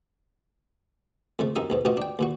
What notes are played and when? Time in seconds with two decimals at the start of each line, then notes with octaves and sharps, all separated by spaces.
1.39 F2 C#3 A3
1.56 C2 F#2 D#4 A#4 E5 D#6
1.70 B1 G#2 B2
1.85 A1 B2 F4 F#4 D#5
1.97 D4 G5
2.19 D#2 A#2 F#4